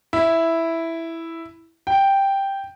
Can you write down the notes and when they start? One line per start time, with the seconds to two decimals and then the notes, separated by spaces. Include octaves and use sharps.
0.13 E4
1.87 G5